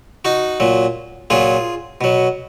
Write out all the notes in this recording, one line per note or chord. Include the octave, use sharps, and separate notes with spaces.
D#4 F#4
A#2 F#3
A#2 F#3 F4 G#4
B2 F#3